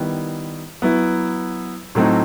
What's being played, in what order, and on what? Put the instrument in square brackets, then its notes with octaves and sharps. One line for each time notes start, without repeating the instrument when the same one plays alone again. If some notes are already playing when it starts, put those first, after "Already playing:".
Already playing: [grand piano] D#3 G3 B3 E4
F#3 B3 E4
A2 F#3 A3 C4 D#4